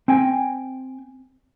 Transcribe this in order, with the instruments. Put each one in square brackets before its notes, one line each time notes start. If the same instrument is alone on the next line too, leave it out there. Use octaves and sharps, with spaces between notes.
[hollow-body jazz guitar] C4 G5 G#5